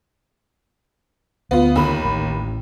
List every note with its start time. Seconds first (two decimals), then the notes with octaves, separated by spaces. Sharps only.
1.51 D2 B3 F4
1.76 D#2 B5
2.05 A1